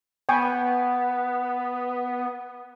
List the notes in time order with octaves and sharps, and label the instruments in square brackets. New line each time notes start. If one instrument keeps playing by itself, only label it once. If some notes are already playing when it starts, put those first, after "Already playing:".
[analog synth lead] B3 [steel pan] G5 G#5 C#6